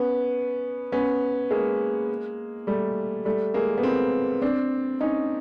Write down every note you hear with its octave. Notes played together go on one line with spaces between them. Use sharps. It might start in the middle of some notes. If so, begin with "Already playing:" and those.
Already playing: B3 C#4
B3 C#4
G#3 A#3
G3 A3
G3 A3
G#3 A#3
B3
A#3 C4
C4 D4
C#4 D#4